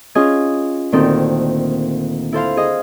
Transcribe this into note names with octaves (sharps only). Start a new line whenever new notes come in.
C#4 F4 G#4 D#5 G#5
D2 A#2 D#3 C4 D#4 A4
E4 A4 C5 F5
G#4 D#5